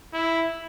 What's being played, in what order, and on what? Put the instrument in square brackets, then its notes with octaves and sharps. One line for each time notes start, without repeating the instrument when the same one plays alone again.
[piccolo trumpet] E4